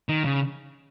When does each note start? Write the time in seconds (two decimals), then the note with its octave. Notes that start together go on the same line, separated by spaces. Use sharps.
0.09 D#3
0.25 C#3